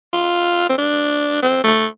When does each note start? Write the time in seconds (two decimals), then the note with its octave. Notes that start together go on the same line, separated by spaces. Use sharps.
0.13 F4
0.69 C4
0.78 D4
1.42 C4
1.64 A3